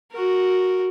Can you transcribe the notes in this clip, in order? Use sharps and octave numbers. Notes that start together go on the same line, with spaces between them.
F#4 A#4